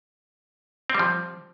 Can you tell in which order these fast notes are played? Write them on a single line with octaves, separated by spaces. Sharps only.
C4 G3 F3